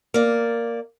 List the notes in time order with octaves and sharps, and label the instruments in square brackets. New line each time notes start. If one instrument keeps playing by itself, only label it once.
[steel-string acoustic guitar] A#3 D5